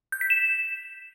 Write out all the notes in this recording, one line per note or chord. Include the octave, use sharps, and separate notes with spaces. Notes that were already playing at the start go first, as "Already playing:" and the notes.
G6
B6
E7